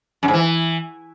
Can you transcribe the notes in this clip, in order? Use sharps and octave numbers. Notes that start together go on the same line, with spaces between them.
F#2
G#2
E3